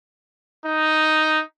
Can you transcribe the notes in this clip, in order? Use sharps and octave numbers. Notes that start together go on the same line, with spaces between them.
D#4